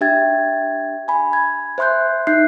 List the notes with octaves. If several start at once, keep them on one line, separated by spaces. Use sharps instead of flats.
D4 G4 E5 G5 G#6 A6
G#5 B5
G#6
C5 E5 C6 F#6 G6
D#4 E5 F#6 G6 C7